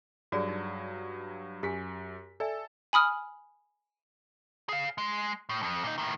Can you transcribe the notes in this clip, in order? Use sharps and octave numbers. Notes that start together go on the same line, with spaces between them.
G2 F#3 F#4 G#4 D5
D#4
F#2 G4 G#5 B6
A4 D5 E5 G#5
G#5 B5 D#6 F6
G#4 F5
G#3
A2
F2
A#2 D#4
A2 D#3